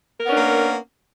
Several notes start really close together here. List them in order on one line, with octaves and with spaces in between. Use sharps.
A#4 B3 C#4 D4 A#3